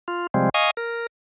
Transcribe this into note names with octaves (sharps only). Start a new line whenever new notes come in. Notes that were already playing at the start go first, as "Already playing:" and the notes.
F4
C3 F3 G3 G#3 C4
D#5 F5 G#5 C#6 D#6
A#4